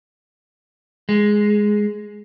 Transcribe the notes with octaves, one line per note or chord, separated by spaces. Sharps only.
G#3